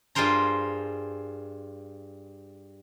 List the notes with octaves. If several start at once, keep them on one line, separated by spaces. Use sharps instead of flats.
G2 F4 G#4 A#4 C5 A#5